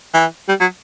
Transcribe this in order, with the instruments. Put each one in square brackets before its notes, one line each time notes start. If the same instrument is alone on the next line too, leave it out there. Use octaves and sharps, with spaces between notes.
[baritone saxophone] E3
G3
F#3